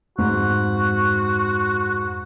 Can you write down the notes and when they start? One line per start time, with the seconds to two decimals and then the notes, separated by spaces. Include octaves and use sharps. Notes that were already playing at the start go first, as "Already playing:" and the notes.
0.18 F2 G#2 F#4